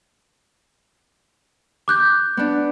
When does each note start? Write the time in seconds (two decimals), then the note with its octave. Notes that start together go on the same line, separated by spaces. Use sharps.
1.88 D6 F#6 G6
2.37 B3 D4